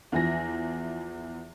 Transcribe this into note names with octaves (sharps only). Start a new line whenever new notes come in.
E2 E3 F3 G#5 A#6